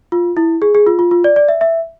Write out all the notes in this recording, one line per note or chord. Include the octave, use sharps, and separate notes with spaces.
F4
E4
G#4
G#4
F4
F4
F4
D5
D5
E5
E5